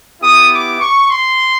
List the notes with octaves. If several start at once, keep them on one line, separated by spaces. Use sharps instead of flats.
B3 E4 G4 D#6
D6
C#6
C6